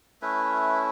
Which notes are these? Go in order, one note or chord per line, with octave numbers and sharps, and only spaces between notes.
A3 C#4 E4 B4